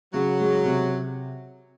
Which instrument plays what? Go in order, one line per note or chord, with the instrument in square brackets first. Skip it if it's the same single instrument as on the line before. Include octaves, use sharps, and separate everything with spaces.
[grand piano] C#3 [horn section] F#3
[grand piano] G#3
C3